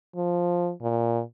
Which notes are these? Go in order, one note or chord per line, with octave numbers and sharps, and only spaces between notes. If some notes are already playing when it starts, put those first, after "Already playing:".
F3
A#2